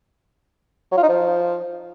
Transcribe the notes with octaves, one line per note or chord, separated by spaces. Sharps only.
F#3
F4
D#4
F3